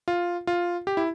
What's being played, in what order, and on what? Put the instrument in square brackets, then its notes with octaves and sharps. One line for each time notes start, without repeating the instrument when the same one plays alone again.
[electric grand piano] F4
F4
G4
E4